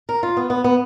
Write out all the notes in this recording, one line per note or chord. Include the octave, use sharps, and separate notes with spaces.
A#4
F4
B3
B3
B3